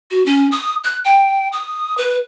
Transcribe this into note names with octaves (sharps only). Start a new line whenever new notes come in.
F#4
C#4
D#6
F#6
G5
D#6
B4